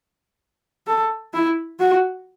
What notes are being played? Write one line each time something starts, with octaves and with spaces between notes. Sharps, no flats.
A4
E4
F#4